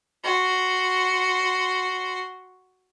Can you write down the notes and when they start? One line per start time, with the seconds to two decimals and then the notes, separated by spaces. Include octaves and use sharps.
0.24 F#4 C6